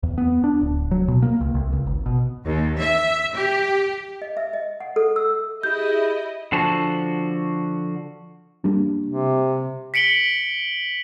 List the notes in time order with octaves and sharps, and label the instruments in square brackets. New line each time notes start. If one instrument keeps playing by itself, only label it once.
[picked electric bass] E2
B3
D4
D1
F#3
B2
A#3
C#2
C2
C#2
G#1
B2
[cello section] D#2
E5
G4
[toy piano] D#5
E5
D#5
F#5
A4
E6
[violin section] E4 D#5 [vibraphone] G4 G#4 [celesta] G6
[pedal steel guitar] D3 F3 F#4 A5
[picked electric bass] G3 A#3 D4
[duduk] C3
[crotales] B6 C#7 D7 F#7 G7